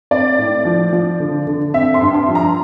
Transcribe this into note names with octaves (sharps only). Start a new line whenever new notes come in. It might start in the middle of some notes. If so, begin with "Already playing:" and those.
C4 D5
A2
F3
F3
D3
D3
C4 E5
C6
G2
C6
F3
A#5